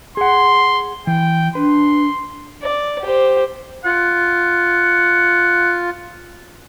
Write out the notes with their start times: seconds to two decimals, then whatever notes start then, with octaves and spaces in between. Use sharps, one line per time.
0.17 G#4 F#5 C6
1.07 E3 G5
1.55 D4 B4 C6
2.63 D5
3.02 G4 C5
3.85 F4 F#5